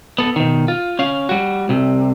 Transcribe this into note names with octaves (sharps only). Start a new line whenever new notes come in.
B3 A4
B2 D#3
F4
C#4 F5
G3 F#4
C2 C3